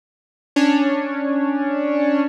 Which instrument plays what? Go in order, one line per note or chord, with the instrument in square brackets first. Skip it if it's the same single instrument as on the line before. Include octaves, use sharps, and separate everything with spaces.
[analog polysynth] C#4 D4 C#5